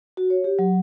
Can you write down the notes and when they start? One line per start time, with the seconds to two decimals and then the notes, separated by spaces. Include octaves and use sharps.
0.17 F#4
0.30 C#5
0.44 G4
0.59 F#3